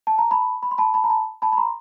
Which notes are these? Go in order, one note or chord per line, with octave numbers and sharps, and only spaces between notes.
A5
A#5
A5 B5
B5
C6
A5 B5
A5 B5
A#5
A5 B5
A5 B5
B5
A#5 C6